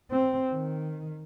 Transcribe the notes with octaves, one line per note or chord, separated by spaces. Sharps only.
C4
D#3